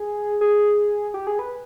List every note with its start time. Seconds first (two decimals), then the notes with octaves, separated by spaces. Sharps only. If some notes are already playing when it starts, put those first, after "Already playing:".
Already playing: G#4
0.41 G#4
1.14 G4
1.27 G#4
1.39 B4